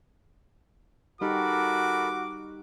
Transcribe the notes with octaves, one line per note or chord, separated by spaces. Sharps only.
G3 D#4 F#4 G4 A4 A#4 B5 D6